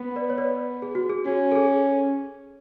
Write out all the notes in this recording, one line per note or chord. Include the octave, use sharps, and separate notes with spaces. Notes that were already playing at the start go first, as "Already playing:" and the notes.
Already playing: B3
B4 D5
C#5
B4 D5
G#4
F#4
G#4
C#4 F#4
A4
G#4